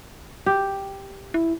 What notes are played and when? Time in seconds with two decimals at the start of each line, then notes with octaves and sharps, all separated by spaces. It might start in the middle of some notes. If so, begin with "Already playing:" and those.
0.46 G4
1.34 E4